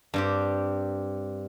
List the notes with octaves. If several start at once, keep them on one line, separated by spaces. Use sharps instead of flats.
G2 C4 G4